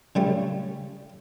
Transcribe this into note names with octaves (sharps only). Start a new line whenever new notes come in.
C#3 G3 A3